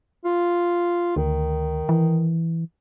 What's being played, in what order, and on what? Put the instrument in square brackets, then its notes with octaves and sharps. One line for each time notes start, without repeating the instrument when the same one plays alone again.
[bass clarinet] F4
[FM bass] D2 [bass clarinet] D#3
[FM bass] E3